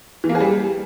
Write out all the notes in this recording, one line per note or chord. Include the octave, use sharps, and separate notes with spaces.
E3
A#3
G#4
G3